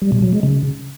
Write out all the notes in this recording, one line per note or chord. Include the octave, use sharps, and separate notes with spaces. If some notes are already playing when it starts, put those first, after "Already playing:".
G3
B2
F#3
G#3
C#3